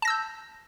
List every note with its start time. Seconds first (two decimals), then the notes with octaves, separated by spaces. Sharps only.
0.02 A5
0.05 A#6
0.08 E6
0.10 G6